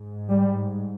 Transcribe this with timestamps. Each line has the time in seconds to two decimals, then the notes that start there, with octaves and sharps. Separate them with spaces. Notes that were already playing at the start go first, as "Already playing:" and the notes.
Already playing: G#2
0.30 G3